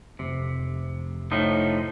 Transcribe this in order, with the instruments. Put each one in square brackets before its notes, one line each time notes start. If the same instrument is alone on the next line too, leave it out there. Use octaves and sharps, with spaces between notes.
[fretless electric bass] F1 [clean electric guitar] C3
[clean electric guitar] A2 F3 D#4